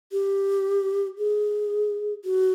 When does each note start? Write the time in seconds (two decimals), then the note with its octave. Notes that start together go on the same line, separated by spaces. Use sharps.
0.12 G4
1.18 G#4
2.25 F#4